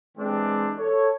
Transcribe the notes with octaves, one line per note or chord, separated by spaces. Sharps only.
E3 G#3 C4 D4 G4
A4 C#5